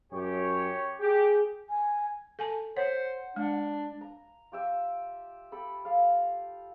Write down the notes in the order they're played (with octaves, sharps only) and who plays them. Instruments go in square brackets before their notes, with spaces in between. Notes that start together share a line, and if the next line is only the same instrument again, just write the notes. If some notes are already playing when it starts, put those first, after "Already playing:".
[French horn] F#2 [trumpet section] G4 C#5
[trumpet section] G4 [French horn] G#4
[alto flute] G#5
[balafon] A4 G#5 A5
[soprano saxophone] C5 [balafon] C#5 [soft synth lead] F#5
[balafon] G#3 [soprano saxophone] D4
[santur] A#5
F4 G4 E5
G4 A4 B5
F4 A4 F5